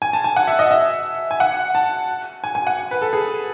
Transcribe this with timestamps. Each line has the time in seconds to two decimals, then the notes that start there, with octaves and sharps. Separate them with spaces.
0.02 G#5
0.13 A5
0.24 G#5
0.36 F#5
0.48 E5
0.59 D#5
0.71 E5
1.31 G#5
1.40 F#5
1.75 A5
2.44 G#5
2.55 G#5
2.67 F#5
2.91 B4
3.02 A4
3.13 G#4